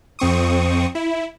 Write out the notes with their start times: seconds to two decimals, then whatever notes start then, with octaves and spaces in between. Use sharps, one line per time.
0.19 F2 C4 C#6 D#6
0.95 E4